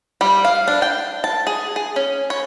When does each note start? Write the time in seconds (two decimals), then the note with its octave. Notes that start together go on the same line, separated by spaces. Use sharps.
0.21 G3
0.45 F5
0.68 D4
0.82 G5
1.24 A5
1.47 G#4
1.76 G#4
1.96 C#4
2.30 C#5